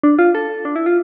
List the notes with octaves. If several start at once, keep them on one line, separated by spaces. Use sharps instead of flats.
D4
F4
A4
D4
E4
F4